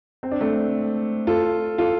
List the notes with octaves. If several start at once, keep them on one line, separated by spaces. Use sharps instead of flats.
C4
D4
A3 C4
F4 A4
F4 A4